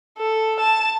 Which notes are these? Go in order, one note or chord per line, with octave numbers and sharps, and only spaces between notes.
A4
A5